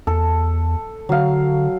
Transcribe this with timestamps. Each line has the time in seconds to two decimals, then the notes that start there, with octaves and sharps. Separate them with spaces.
0.07 E2 A4
1.09 D3 F#3 F5